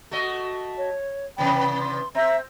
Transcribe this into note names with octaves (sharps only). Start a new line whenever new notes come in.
A3 F#4 D#5
C#5
C3 E3 B3 G5 B5
C6
C4 E5 A#5